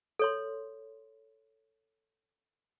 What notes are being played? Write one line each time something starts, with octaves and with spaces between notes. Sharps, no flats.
A4 C#5 C6